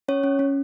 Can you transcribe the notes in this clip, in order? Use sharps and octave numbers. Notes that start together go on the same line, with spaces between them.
C#4 C#5
C#4
C#4